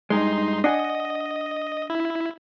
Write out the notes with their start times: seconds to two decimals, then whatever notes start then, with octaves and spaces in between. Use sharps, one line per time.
0.10 G2 G#3 D#4 C6
0.64 D4 D#5 F#5 G#5
1.90 E4